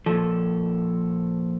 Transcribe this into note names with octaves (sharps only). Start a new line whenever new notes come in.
A#2 F3 A4